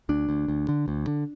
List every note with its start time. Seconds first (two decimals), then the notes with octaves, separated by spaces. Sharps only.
0.09 D2 D4
0.29 D2
0.48 D2
0.69 D3
0.88 D2
1.07 D3